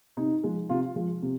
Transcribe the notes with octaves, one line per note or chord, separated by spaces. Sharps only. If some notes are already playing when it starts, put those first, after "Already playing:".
C3 D#4
F3 G#3
C3 F4
F3 G#3
C3